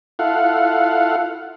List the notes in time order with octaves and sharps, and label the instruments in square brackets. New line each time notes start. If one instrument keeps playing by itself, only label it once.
[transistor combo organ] E4 F4 A4 F5 F#5